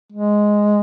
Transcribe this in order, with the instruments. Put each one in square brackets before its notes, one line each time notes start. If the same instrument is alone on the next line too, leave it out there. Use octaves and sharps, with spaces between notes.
[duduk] G#3